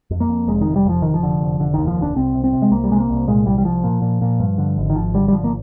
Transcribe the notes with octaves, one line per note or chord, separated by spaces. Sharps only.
F2
A#3
F2
F1 G#3
D#3
F1
G3
F2 F3
F1 D#3
F3
D3
F1
F1 D3
D#2 D#3
F3
F1
D4
C2 C4
C3
C4
C3
G#3
C2 A#3
G3
C3 G#3
A#3
C2
A#2 G#3
C2 G3
G3
C2 F3
A#2
A#2
A#2
G2
D3
G#1
D#3
G#1 F3
D3 G3
G3
G#1 F3
A#3